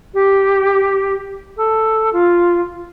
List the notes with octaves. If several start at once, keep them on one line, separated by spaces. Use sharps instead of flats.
G4
A4
F4